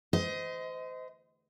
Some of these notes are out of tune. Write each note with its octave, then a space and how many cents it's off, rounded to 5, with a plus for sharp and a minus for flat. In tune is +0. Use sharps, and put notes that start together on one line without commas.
C5 -30 D#5 +20